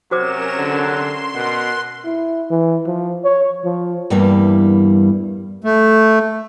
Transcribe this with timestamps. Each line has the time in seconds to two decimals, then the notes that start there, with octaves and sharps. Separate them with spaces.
0.11 C3 F#3 C#4 F#4 A#4 C5 D6 E7
0.58 D3 C6
1.34 B2 A#4 F#5
2.05 E4
2.50 E3
2.87 F3
3.24 C#5
3.65 F3
4.10 E2 G2 E3 G3 A#3
5.64 A3